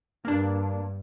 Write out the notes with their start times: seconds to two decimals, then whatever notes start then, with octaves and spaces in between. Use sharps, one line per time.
0.25 G2 A#3 D4